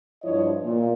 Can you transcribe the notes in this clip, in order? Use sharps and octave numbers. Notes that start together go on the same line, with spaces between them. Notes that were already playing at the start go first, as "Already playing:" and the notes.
G2 F3 E4 C#5 D#5
A#2